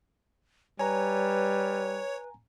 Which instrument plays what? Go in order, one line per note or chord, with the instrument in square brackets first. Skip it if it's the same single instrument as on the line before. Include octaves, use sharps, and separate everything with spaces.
[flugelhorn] G3 [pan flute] B4 [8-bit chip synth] C#5 [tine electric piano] G#5 A#5